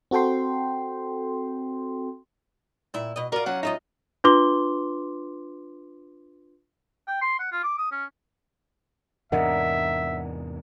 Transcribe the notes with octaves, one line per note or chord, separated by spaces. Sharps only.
C4 F#4 A4 G5 C6
A#2 E4
B2 D#5
F4 F#4 A#4 D5
F#3 C#4 F#5
D#4 F4 D#5 E5
D4 F4 B4 C6 D6 G7
G5
C6
F#5
F4
D6
D#6
C#4
E2 G#2 C3 D4 A#4 D#5 E5 F#5